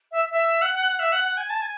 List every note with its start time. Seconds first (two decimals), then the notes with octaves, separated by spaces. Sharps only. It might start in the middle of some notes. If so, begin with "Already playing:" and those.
0.12 E5
0.31 E5
0.62 F#5
0.74 F#5
0.86 F#5
0.99 E5
1.12 F#5
1.24 F#5
1.37 G#5
1.50 A5
1.62 G#5